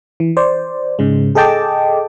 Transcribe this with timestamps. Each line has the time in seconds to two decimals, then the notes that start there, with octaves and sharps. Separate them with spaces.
0.20 E3
0.37 C5 D5
0.99 G#2 C#3 G#3
1.35 G#4 A4 D#5 G5 A5 D6